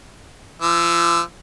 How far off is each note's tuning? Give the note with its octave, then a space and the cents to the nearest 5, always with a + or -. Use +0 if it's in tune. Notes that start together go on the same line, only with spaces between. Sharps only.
F3 -35 E6 +0